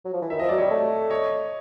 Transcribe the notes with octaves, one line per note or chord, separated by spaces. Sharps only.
F#3
F3
E3
D#3 E5
F3 D#5
F#3 D5
G3 C#5 D#5
A3
C#5 D#5